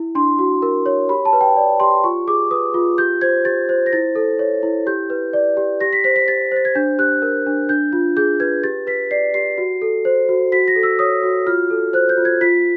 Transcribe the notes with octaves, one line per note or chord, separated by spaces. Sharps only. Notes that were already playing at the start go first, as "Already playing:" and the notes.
Already playing: E4
D4 C6
F#4
A#4
C#5
G4 B5
A5
B4
G5
D5
G4 C6
F4 C#6
G#4 D6
B4 D#6
F4
G4 G6
C5 G#6
G4 A6
C5
A#6
E4 A6
A4
C#5
E4
G4 G6
B4
D5
G4
G4 A#6
B6
C5 B6
B6
G4 A6
C5 A6
G#6
D4 G6
G4 F#6
A#4
D4
D4 G6
F4
G#4 G6
B4 G#6
G4 A6
B4 B6
D5 C7
G4 C7
F#4
A4
C5
F#4
F#4 B6
A#6
A4
E6
C#5 D#6
F#4
F4 F6
A4
C5 F#6
G6
F4
G#6
F4 B6